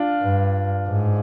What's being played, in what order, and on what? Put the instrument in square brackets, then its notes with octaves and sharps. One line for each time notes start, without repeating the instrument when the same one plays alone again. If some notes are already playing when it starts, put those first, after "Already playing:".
Already playing: [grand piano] D4 F4
[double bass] G2
G#2